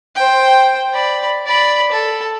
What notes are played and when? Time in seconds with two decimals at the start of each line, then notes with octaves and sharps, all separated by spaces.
0.16 C5 G5
0.94 D5 B5
1.47 D5 B5
1.92 A4